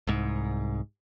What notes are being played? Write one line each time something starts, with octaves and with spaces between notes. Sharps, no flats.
C2 G#2